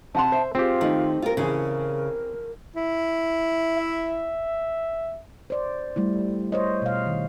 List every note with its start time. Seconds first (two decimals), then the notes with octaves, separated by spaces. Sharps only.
0.15 C3 F#5 A5 C6
0.32 C5 E5
0.55 C4 F4 G4 G#4
0.81 D#3 A3 D#5
1.22 F4 A#4
1.37 A1 C#3 E3 G#4 A#4
2.76 E4
3.77 E5
5.50 C5 D5
5.96 G3 A3 E4
6.52 C5 C#5 D#5
6.82 B2 F5
7.07 D#3